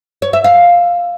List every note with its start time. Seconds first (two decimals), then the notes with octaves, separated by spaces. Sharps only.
0.22 C#5
0.33 E5
0.44 F5